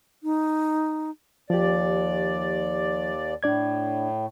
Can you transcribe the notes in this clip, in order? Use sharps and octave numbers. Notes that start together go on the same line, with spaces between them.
D#4
D#2 F3 G4 D5
A2 D4 D5 G#6